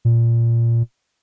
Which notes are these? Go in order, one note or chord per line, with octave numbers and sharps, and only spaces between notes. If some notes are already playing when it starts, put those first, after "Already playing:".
A#2